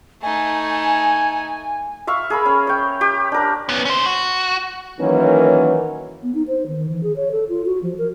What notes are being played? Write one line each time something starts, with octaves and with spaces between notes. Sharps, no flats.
A3 D#4 G#5
E5 F5 C#6
G#4 A#4 B5
C#4
C#5 G5
G4
D4 A#4
B3 C#4
C#4 C5
F#4
D#3 E3 F#3 A#3 C#4
B3
D#4
C5
D#3
E3
G#4
C#5
A4
F4
F#4
F3
A#4